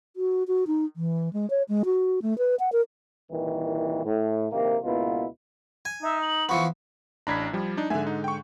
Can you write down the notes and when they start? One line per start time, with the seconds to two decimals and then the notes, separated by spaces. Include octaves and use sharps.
0.16 F#4
0.47 F#4
0.67 D#4
0.96 E3
1.33 G#3
1.50 C#5
1.69 G#3
1.85 F#4
2.22 A3
2.38 B4
2.59 F#5
2.72 A#4
3.31 C2 A#2 D#3 E3
4.05 A2
4.52 A#1 C3 D#3 A#3
4.83 C#2 B2 A#3 B3 E4 F4
5.85 G#5
6.02 D#4 E5
6.22 F#7
6.49 E3 F3 B3 C#6
7.27 A1 D4 A#5 B5 G#6 B6
7.53 F3 G3
7.77 D4 D#4
7.90 G#2 D3 E5 G#5
8.07 D#4
8.24 G5 C#6